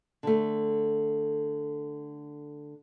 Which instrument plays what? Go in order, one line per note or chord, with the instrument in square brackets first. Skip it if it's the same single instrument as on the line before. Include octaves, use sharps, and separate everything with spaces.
[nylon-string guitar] D3 A3